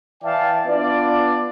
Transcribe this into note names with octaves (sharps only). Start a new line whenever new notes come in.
E3 D5 E5 F5 G5 A5
B3 D4 F4 D5